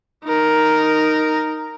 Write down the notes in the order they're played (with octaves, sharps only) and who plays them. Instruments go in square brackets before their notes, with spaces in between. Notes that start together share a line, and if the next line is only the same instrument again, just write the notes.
[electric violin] D#4 A#4